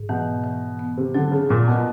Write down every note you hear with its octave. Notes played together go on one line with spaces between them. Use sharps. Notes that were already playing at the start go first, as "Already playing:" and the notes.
Already playing: G#2
B2 E3
E3
B3
C3
D3 F#3
C#3
A#2 F#3
B2